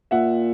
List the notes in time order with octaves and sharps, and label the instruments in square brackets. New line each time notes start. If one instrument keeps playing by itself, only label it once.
[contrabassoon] A#2 [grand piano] E5 F#5